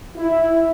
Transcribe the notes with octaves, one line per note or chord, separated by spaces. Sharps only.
E4